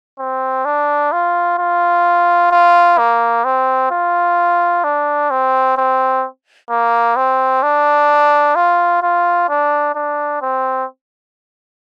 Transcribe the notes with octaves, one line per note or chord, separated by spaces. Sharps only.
C4
D4
F4
F4
F4
A#3
C4
F4
D4
C4
C4
A#3
C4
D4
F4
F4
D4
D4
C4